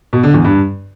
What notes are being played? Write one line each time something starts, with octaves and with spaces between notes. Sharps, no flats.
B2
D3
E2
G2